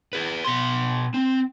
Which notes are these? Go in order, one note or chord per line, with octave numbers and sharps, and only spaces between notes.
G#4 B4
B2 C6
C4